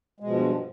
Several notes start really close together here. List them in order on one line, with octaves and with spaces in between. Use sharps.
G#3 B2 F3 G2